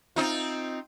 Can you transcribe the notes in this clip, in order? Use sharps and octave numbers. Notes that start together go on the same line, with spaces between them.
C4 D#4 F4